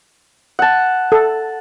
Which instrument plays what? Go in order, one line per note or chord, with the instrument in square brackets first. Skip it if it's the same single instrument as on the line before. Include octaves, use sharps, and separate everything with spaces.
[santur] F#5 A5
[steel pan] A4